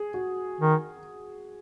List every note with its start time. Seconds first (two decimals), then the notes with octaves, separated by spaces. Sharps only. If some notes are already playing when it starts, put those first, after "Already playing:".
Already playing: G#4
0.14 F#4
0.61 D#3